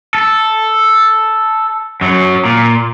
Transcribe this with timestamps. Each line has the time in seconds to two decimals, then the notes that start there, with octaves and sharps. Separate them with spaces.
0.15 A4
2.01 F#2 F#3
2.45 A#2